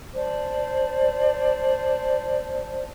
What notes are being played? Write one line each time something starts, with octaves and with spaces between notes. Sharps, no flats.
C5 D5 A5